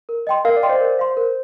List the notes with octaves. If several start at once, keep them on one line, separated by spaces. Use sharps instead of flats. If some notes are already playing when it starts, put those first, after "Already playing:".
A#4
D#5 G5 C6
A#4 F5
D5
D#5 G5 C6
C5
A#4
F5 C6
A#4